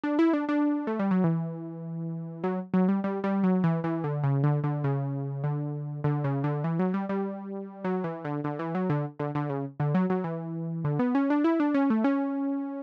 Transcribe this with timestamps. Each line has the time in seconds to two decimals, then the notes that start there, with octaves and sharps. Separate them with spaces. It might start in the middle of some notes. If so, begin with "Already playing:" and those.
0.04 D4
0.19 E4
0.33 D4
0.49 D4
0.87 A3
0.99 G3
1.11 F#3
1.24 E3
2.44 F#3
2.74 F#3
2.89 G3
3.04 G3
3.24 G3
3.44 F#3
3.64 E3
3.84 E3
4.04 D3
4.24 C#3
4.44 D3
4.64 D3
4.84 C#3
5.44 D3
6.04 D3
6.24 C#3
6.44 D3
6.64 E3
6.79 F#3
6.94 G3
7.09 G3
7.84 F#3
8.04 E3
8.25 D3
8.44 D3
8.59 E3
8.75 F#3
8.90 D3
9.20 D3
9.35 D3
9.49 C#3
9.80 D3
9.95 F#3
10.10 F#3
10.24 E3
10.85 D3
10.99 B3
11.15 C#4
11.30 D4
11.44 E4
11.60 D4
11.75 C#4
11.90 A3
12.04 C#4